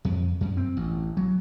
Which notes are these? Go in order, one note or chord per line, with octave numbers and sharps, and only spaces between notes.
F2
F#2
C4
A1
F#3